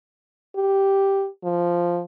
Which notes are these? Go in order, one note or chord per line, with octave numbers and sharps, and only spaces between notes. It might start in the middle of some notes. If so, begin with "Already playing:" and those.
G4
F3